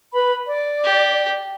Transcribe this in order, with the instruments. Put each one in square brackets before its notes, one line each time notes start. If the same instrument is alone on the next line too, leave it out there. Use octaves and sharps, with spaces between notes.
[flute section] B4 B5
D5
[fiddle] G4